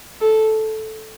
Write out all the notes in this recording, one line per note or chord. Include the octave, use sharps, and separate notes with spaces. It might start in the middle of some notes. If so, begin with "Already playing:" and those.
A4